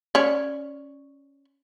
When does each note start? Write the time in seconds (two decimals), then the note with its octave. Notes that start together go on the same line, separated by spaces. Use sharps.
0.15 C#4 C#5 D5